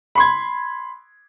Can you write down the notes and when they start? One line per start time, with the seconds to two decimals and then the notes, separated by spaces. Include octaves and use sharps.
0.15 B5 C6 G#6